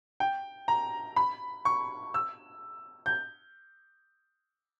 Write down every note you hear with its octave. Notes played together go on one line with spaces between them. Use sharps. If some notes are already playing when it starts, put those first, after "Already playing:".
G5
A#5
B5
C#6
E6
G6